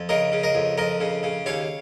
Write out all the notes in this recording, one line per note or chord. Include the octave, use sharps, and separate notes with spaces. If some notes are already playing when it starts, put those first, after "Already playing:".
Already playing: F2
C#3 A#4 D#5
C#3
A#4 D#5
F2
F2 A#4 D#5
C#3
C#3
D#2 C#5 F5